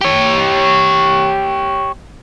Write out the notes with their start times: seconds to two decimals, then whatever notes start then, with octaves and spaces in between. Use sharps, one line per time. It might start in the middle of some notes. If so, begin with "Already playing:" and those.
0.01 G4 C#5